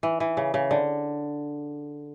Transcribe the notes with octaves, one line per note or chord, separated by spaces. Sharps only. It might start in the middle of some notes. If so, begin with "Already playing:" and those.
E3
E3
C#3
C#3
D3